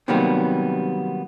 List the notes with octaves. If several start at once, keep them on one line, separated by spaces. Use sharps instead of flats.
C3 D#3 F#3 G3 A#3 B3